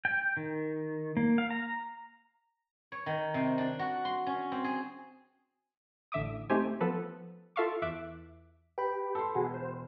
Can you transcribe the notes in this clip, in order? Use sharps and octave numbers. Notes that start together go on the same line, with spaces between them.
G5
D#3
A#3
F5
A#5
C#5
D#3
C3
D4
F#4
C6
C#4
C4
G#4
A1 D3 E5 D6 D#6
A3 C4 D#4 G4 C5 G#5
F3 B3 A4 B4
F4 A4 E5 F5 C#6 D6
E2 E5 D6 F#6
G4 B4 G5 B5
A4 C6
E1 F#4 G#4
C5